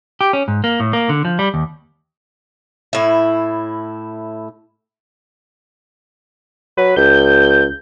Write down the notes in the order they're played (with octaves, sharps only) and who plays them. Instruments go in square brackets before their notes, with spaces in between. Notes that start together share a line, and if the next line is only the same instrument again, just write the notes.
[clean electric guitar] G4
C#4
G#2
A#3
A2
A#3
D3
F3
G3
D#2
[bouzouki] A2 E4
[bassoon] F#3 [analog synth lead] B4
[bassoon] C#2 [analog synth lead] G6